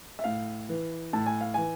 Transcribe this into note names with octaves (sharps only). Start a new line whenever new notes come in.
E5
A2 F5
E3
A2 A5
G#5
F5
E3 G#5